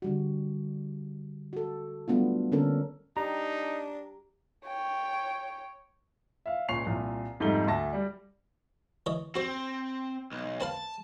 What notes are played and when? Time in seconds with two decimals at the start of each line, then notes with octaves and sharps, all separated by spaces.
0.02 D3 G3 F#4
1.53 F#4 A4
2.08 F#3 G3 A3 B3 D4 F4
2.52 D3 A#3 C#4 D4 A4 A#4
3.17 D4 D#4 G4 A#5
4.67 C#5 G5
6.46 E5 F5
6.69 C#2 A#2 C#5 C#6 C7 F7
6.86 C2 A#2
7.40 F2 G#2 G3 A3 D#4 G7
7.67 D2 E5 A5 A#6
7.93 G3 D5
9.06 E3 C#5 D#5
9.35 C4 F#4 C5
10.32 B1
10.61 C4 B4 F5 A5